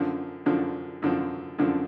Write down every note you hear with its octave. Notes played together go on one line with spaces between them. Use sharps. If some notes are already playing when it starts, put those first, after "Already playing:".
Already playing: F#2 D3 F3
F#2 D3 F3
F#2 D3 F3
F#2 D3 F3